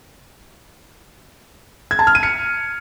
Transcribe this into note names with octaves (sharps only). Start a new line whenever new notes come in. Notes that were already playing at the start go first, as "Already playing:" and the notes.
G#6
A5
F6
D#7
C#7